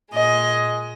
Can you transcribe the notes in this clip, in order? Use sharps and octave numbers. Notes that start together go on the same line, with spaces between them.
A#2 G#3 D#5